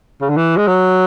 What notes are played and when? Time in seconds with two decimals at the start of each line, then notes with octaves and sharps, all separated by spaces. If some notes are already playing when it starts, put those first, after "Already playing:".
0.22 C#3
0.29 D3
0.37 E3
0.57 G#3
0.67 F#3